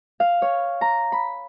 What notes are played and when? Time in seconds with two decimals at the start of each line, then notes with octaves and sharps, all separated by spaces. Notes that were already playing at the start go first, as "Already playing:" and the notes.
0.20 F5
0.42 C#5
0.81 A#5
1.12 B5